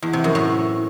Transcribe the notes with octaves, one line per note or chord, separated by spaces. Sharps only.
E2
C3
F#2
A2